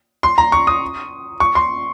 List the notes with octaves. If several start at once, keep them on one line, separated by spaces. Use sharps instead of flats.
C6
A#5
C#6
D#6
C#6
C6